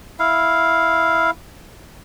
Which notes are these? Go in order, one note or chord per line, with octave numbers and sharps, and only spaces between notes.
E4 F5